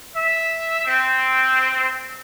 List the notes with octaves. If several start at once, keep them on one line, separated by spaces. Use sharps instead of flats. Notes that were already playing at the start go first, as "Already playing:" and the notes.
E5
C4